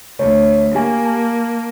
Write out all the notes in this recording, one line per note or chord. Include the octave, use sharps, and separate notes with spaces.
D2 C#5
A#3 G4 G#5
A5